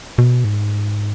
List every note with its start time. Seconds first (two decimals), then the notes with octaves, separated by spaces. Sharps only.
0.18 B2
0.44 G#2